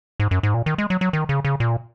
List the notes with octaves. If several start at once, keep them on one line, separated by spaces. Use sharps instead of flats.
G#2
F#2
G#2
A#2
D#3
G#3
F#3
F#3
D#3
C#3
C#3
A#2